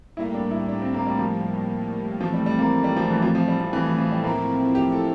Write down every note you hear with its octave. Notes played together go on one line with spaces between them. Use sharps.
A2 G3 A#3 E4
D4
E4
D4
C4
A#3
G3
F3
A2 E3 F3 A3 C4
G3
G3
A#3
G3
F3
E3
F3
F3
G3
F3
E3
F3
F3
G3
A2 F3 A#3 C4 E4
G4
A4